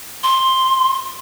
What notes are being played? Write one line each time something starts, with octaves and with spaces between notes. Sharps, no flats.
C6